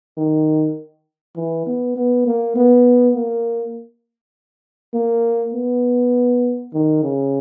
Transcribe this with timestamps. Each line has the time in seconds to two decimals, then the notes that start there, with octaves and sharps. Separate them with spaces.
0.17 D#3
1.36 E3
1.67 B3
1.96 B3
2.26 A#3
2.56 B3
3.15 A#3
4.94 A#3
5.54 B3
6.74 D#3
7.03 C#3